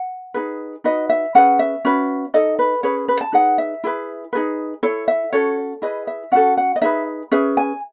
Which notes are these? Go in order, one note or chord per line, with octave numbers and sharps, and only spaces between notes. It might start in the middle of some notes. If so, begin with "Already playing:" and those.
Already playing: F#5
D#4 G#4 B4
D#4 F#4 B4 D#5
E5
C#4 G#4 B4 F#5
E5
C#4 F#4 B4
D#4 A4 D#5
B4
C#4 G#4 B4 C#5
B4
A5
D#4 G#4 B4 F#5
E5
E4 G#4 B4
D#4 G#4 B4
E4 A4 C#5
E5
C#4 F#4 A4 C#5
E4 G#4 B4 D#5
E5
C#4 F#4 A4 F#5
F#5
D#5
D#4 G#4 B4 E5
C#4 G#4 B4 E5
G#5